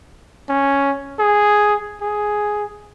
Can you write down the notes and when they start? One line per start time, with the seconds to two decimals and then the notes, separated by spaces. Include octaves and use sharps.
0.49 C#4
1.19 G#4
2.01 G#4